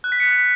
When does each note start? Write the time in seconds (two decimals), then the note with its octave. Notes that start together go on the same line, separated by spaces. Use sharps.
0.04 F#6
0.12 B6
0.20 C#7